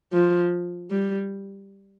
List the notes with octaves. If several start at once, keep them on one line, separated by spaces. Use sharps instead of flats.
F3
G3